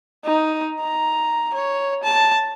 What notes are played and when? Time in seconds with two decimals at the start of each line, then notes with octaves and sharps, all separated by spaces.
0.25 D#4
0.81 A#5
1.54 C#5
2.03 A5